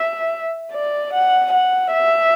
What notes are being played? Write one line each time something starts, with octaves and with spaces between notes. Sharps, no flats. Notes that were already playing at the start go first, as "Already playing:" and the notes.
Already playing: E5
D5
F#5
F#5
E5